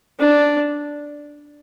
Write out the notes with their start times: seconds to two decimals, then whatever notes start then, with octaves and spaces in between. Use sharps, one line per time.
0.20 D4